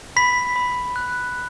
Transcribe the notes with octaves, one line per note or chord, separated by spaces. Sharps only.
B5 B6
B5
F#6